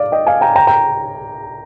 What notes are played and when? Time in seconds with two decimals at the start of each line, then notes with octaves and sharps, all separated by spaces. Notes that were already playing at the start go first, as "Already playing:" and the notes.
Already playing: D5 F5
0.12 D#5 G5
0.27 F5 G#5
0.41 G5 A#5
0.56 G5 A#5
0.67 G5 A#5